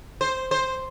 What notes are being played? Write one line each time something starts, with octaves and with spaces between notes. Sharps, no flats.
C5
C5